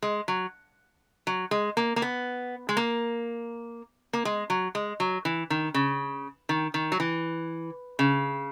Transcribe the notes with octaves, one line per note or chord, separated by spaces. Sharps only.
G#3
F#3
F#3
G#3
A#3
A#3
B3
G#3
A#3
A#3
G#3
F#3
G#3
F#3
E3
D#3
C#3
D#3
D#3
F#3
E3
C#3